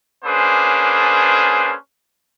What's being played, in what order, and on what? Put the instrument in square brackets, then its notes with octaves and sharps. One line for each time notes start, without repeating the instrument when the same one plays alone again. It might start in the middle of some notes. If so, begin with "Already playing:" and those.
[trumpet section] A#3 C#4 D4 G#4 B4 C5